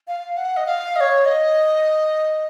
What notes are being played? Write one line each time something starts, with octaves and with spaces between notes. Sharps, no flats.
F5
F#5
D#5
F5
D#5
C#5
D#5